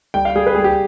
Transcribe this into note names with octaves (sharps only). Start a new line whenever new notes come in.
G3 G5
F5
G3 G#4
B4
G3 G#4
G4